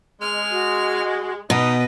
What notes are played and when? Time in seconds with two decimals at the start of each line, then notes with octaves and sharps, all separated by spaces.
0.21 G#3 F6
0.51 F#4
1.50 B2 D#4 B4 D#5